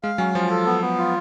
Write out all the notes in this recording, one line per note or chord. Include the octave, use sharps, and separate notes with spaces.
G#3 F5
F#3 C#4
F3 F4
A4
B3
B3
F4